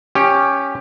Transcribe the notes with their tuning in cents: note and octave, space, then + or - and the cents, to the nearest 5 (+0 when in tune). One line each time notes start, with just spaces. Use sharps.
C#4 +0 G4 +15